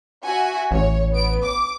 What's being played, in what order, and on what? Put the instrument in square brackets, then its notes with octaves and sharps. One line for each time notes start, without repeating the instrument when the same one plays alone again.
[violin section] F#4 E5 G#5
[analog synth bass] A1 [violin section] C#5
[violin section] B3 D7
D6